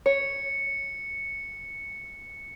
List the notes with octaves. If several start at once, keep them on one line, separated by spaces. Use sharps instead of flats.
C#5 C#7